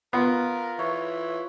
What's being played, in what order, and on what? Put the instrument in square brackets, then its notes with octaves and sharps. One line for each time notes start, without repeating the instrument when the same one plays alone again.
[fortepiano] B3 [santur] F4 [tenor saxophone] A#4
[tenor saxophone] E3 [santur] C#5